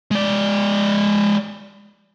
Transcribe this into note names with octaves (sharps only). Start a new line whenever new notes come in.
G#3 D5